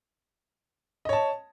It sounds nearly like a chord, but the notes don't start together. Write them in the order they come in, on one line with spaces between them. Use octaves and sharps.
D#5 C#5 A5